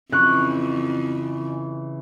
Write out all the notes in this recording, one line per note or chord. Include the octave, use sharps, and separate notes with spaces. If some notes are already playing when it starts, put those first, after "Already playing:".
F2 C#3 E3 C#6 F#6